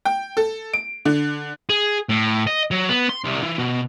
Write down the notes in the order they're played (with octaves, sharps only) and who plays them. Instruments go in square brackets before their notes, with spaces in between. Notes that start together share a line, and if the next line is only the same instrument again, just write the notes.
[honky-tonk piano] G5
A4
D7
D3
[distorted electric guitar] G#4
A2
D#5
F#3
B3
C6
C2
E3
B2